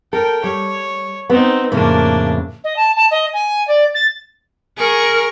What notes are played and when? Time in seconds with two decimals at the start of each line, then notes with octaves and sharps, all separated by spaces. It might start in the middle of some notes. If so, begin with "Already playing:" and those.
0.13 A4 A#4 G5
0.44 G3 C#5
1.30 B3 C4 D#4
1.72 F2 A2 C#3 A#3 D4
2.64 D#5
2.76 A5
2.96 A5
3.11 D#5
3.33 G#5
3.67 D5
3.95 A6
4.78 G#4 A#4 C#6